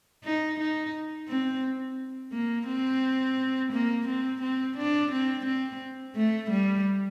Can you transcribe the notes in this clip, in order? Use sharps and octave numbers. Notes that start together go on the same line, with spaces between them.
D#4
D#4
C4
A#3
C4
A#3
C4
C4
D4
C4
C4
A3
G3